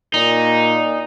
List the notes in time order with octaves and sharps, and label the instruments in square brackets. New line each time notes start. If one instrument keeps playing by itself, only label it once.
[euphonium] A#2 [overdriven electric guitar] D#4